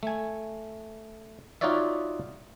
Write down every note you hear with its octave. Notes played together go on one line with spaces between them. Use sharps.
A3 G#5
D#4 F4 F#4 C#5 D5 E5